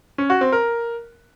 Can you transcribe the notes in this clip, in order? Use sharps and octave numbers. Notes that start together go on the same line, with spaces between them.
C#4
F#4
C4
A#4